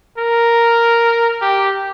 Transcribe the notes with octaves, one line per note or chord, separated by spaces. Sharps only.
A#4
G4